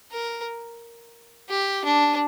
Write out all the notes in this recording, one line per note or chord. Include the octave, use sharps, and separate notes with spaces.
A#4
G4
D4